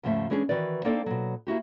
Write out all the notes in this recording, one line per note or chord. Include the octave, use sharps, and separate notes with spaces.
D#2 G#2 C#3 F3 A3 E5
E3 G#3 C#4 D4 G#4
D#3 E3 F#4 B4 D5
A#3 C4 D4 D#4 A4 D5
B2 F#3
A#3 E4 F#4 G4